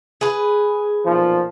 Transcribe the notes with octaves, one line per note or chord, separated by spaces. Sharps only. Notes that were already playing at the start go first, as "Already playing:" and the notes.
G#4 B4
B1 A#2 F3